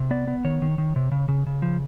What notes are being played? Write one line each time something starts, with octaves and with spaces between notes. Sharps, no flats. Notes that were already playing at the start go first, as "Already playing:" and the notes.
Already playing: C3
B3 D5
B3
D#3 C#5
D#3
D#3
C3
C#3
C#3
C#3
F3